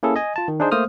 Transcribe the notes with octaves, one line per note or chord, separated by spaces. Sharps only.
A#3 C#4 E4 G#4 A4
D#5 G#5
F4 A5
D#3
D4 D#4 G#4 C5
A3 A#3 C5 D#6 F6